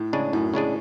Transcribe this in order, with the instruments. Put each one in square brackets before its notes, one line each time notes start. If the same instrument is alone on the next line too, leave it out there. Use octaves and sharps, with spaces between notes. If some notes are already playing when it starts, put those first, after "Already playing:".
Already playing: [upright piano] A2
[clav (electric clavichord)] C#3 G#3 D4 G#4
[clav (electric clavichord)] F#2 [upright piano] A2
[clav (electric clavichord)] C#3 G#3 D4 G#4